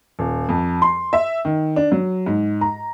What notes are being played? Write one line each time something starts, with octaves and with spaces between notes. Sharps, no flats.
D#1
F2
C6
E5
D#3
D4
F#3
G#2
A#5